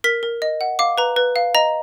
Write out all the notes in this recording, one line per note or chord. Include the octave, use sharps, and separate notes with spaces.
A#4 B6
A#4
D#5
F#5
F5 D6
B4 A#5
B4
F5
D#5 A#5